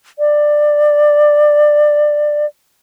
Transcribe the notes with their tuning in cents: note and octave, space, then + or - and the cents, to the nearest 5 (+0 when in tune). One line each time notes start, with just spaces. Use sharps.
D5 +15